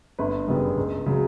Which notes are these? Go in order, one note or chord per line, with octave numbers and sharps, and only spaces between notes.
G1 B4
F#2 C#3 G3 B3
C#2
C#3 F#3